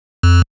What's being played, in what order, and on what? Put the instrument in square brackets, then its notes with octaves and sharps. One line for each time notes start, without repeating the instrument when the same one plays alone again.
[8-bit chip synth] F2